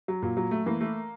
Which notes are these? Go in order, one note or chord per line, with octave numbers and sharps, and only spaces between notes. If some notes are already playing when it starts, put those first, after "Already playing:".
F#3
A#2
F#3
A3
E3 A#3
A3